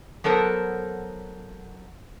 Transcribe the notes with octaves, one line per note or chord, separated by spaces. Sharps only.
F#3 B3 A4 A#4 C5